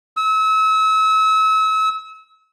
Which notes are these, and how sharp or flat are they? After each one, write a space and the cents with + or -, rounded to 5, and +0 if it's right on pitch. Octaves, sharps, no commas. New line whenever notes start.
E6 -35